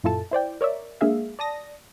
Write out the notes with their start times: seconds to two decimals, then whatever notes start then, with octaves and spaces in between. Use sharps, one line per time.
0.04 F#2 A#2 E4 F4 A4 A5
0.31 E4 C5 D5 G5
0.61 A#4 C#5 D5 E5
1.01 G#3 A#3 D4 G#4 E5 F5
1.39 D5 A5 D#6 A#6